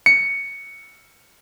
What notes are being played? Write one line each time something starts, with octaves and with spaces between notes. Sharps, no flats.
C#7